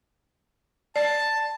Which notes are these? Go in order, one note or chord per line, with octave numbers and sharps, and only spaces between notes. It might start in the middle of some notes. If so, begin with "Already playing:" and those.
D5 A5